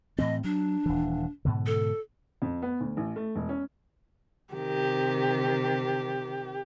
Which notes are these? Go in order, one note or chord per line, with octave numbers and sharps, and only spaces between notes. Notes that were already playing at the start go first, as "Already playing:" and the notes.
A2 E3 C4 D#5
F#3 D4
D#1 E3
G#2 B2 D3
A4
F2
B3
D2
A1
A3
E1
C#4
C3 D#3 G4